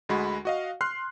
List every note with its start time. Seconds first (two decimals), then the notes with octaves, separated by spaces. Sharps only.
0.09 D2 G#3 F#4 B5
0.45 F#4 D#5 F5
0.81 C6 F6 F#6 C7